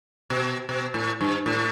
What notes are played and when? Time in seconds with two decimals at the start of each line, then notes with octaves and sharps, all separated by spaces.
0.30 B2
0.69 B2
0.94 A2
1.21 G2
1.46 A2